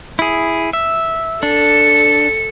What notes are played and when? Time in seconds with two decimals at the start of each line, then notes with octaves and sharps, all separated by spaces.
0.19 E4 G#4
0.73 E5
1.43 D4 A4 C#7